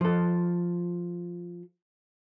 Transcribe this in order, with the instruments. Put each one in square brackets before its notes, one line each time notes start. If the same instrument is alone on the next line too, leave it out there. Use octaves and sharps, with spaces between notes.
[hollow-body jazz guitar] F3 A4